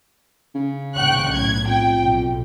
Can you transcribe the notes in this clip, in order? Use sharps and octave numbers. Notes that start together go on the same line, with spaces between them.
C#3
G5 C#6 F#6
B1 A2 G#6
F2 G5
B1